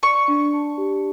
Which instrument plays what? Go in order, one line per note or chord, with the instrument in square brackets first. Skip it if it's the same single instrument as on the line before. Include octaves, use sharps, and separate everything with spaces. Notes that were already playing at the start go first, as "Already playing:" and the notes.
[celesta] D5 [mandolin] C#6
[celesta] D4
A5
G4